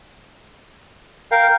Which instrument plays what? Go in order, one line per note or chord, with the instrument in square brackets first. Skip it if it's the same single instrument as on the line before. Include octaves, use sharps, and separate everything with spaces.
[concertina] A#4 F5 [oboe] G5